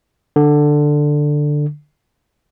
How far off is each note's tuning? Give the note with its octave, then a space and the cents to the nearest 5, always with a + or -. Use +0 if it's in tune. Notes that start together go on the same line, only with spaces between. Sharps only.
D3 +10